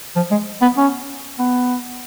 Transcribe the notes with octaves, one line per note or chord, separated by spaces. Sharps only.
F3
G#3
B3
C#4
B3